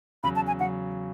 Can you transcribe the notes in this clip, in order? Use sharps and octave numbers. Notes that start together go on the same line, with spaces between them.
E2 C#3 F#3 B5
A5
G#5
C#3 F#3 F#5